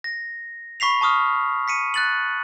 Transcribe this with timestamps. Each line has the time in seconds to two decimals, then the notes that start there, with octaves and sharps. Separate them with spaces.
0.04 A#6
0.80 B5 C#6 B6 C7 F7
1.01 A5 C#6 D#6 F6
1.68 B6 C#7 D#7
1.94 F#6 A6 F#7